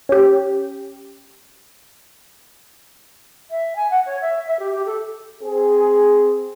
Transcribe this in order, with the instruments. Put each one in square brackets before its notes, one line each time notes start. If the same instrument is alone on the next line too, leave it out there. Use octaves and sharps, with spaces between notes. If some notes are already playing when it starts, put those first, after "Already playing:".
[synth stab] C#4 G4
[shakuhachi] E5
G#5
F#5
C#5
E5
E5
G4
G4
A4
[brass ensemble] C4 G#4